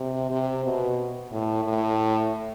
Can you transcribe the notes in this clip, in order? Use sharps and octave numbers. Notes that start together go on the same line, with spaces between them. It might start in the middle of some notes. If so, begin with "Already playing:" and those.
Already playing: C3
C3
B2
A2
A2